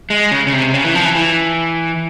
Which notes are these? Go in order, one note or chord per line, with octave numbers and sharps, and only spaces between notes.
G#3
C#3
C#3
C3
C#3
E3
F3
E3
E3